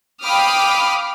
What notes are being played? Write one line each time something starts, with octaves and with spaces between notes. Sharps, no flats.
F5 G5 B5 D6 D#6 F6